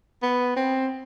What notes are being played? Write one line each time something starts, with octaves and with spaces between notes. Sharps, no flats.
B3
C4